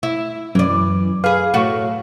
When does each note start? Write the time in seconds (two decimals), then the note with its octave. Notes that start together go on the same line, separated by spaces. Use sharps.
0.03 E4
0.55 F#2 E3 D5
1.24 G#4 B4 F5
1.54 F#2 A2 F#4